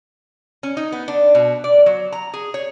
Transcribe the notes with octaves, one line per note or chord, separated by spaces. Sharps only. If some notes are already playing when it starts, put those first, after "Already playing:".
C#4
D#4
B3
D4
B2
D5
F#3
A#5
G#4
C#5